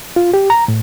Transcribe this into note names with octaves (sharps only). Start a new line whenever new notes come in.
F4
G4
A#5
A2